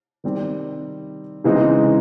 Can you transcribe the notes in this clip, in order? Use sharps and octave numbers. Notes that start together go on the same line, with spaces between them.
D#3 G3 C4
C#3 E3 G#3 C4 D#4